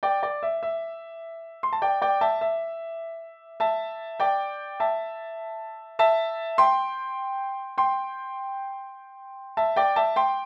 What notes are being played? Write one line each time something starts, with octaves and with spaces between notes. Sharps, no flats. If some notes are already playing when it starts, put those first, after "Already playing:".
D5 G5
D5
E5
E5
C6
A5
D5 G5
D5 G5
E5 A5
E5
E5 A5
D5 G5
E5 A5
E5 A5
G5 C6
G5 C6
E5 A5
D5 G5
E5 A5
G5 C6